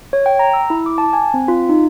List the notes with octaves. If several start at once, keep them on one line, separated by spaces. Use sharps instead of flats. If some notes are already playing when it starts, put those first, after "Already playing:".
C#5
G5
A#5
E6
E4
D6
A5
G#5
C4
F4
D#4